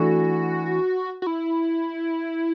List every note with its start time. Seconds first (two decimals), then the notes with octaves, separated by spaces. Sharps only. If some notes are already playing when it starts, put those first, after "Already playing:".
Already playing: E3 A3 D4 F#4
1.22 F#4
1.27 E4